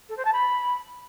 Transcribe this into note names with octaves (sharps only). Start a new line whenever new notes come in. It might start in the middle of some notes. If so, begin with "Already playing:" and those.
A4
C5
A5
B5